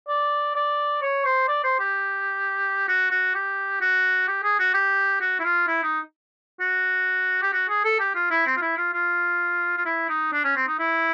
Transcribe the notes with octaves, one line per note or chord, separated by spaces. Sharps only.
D5
D5
C#5
C5
D5
C5
G4
F#4
F#4
G4
F#4
G4
G#4
F#4
G4
F#4
E4
F4
E4
D#4
F#4
G4
F#4
G#4
A4
G4
F4
E4
C4
F4
E4
F4
F4
F4
E4
D#4
D4
C#4
C4
D#4
E4